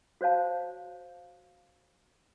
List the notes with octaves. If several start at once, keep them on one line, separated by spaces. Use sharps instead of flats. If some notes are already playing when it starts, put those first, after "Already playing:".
F#4 C5 C#5 F5 A5